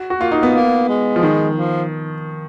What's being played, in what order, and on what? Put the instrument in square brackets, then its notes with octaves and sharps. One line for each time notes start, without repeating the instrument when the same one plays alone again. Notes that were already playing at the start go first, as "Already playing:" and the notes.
Already playing: [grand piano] F#4
F#4
[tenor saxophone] A#3 [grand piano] F4
[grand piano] D#4
B3
[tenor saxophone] A#3
G#3
[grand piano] F3
D#3
[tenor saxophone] F3